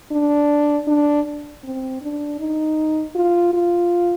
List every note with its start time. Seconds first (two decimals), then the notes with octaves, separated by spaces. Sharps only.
0.11 D4
0.87 D4
1.64 C4
2.01 D4
2.40 D#4
3.15 F4
3.53 F4